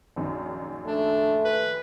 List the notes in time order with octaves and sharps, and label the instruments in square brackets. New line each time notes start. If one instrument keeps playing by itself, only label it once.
[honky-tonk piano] A#1 F#2 D#3
[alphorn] A3 [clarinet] D4
[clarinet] B4